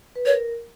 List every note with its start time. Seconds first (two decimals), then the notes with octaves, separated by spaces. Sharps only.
0.16 B4
0.25 A#4 C#5